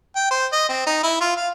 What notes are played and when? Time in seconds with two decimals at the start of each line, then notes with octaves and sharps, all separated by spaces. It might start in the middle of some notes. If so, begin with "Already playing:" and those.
0.16 G5
0.31 C5
0.53 D#5
0.69 C4
0.87 D#4
1.03 E4
1.21 F4
1.36 F5